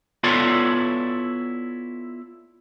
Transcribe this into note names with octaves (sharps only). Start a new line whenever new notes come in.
B3 E4 F4 A4 C#5 D5